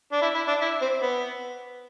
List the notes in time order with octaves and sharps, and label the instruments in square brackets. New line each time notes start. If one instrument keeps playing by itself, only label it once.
[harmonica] D4
E4
E4
D4
E4
C4
B3